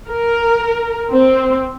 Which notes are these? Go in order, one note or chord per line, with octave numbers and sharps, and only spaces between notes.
A#4
C4